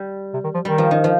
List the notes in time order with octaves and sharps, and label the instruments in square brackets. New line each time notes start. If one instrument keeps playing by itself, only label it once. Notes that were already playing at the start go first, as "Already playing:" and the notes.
Already playing: [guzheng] G3
[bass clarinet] C3
D#3
F3
[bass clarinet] D#3 [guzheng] G3
[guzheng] F3
D#3
F3